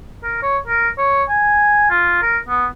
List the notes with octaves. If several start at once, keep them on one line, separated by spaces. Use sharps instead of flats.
A#4
C#5
A#4
C#5
G#5
F4
A#4
B3